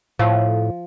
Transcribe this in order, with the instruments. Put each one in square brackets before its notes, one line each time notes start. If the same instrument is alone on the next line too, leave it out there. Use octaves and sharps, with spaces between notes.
[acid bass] A2 [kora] F3